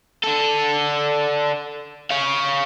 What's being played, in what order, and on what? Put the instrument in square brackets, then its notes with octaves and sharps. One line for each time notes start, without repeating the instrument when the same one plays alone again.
[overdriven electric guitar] D3 A4
C#5 F5